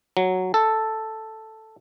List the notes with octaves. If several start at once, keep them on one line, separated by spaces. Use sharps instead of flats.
F#3
A4